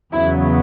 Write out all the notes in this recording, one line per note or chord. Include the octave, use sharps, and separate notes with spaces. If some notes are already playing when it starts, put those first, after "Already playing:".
E2 C#3 F#3 B3 E4